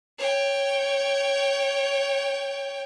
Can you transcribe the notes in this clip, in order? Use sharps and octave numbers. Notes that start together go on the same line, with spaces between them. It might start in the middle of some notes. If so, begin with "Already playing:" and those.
C#5 G5